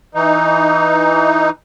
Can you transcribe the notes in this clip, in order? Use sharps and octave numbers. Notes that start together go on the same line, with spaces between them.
E3 D#4